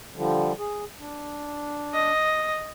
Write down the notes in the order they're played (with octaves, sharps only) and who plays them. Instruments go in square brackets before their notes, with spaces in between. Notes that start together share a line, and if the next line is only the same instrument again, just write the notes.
[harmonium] D3 F3 G3
G#4
D4
[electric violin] D#5